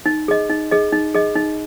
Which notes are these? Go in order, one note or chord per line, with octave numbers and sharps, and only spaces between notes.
D#4
G#4 D#5
D#4
G#4 D#5
D#4
G#4 D#5
D#4